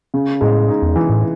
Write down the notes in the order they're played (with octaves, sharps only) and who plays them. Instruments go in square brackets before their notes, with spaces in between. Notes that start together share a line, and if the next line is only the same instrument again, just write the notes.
[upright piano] C#3
[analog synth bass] A2 [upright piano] G#3
[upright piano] D#4
[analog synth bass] E2
[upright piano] E3
[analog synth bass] A2